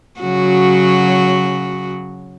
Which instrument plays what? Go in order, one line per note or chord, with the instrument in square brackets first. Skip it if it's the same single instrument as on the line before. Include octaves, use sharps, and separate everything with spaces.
[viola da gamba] C#3 F#3 F#4